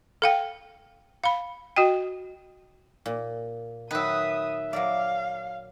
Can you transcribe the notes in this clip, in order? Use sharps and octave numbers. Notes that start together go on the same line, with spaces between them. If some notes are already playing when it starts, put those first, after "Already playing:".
A4 F5 G5
F5 B5
F#4 D#5 G5
A#2
D#3 F#3 B4 E5 D#6
F#3 A#4 D5 F5